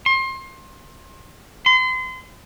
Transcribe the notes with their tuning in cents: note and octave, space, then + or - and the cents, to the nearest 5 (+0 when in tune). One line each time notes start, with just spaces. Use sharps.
C6 +30
C6 -35